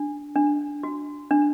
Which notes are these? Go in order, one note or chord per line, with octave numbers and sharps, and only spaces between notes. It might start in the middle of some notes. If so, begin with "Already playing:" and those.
Already playing: D4
D4
F#4
D4